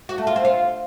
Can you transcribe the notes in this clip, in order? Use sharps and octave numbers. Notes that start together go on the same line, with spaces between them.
F#4
A3
F4
C4
F4